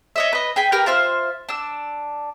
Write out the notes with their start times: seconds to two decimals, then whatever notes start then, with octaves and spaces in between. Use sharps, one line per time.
0.16 C#5 D#5 E5
0.33 B4 D#5
0.56 G#4 G5 B5
0.72 G4 A#4 B4 F6
0.86 F4 C5 E5 F6
1.49 D4 E6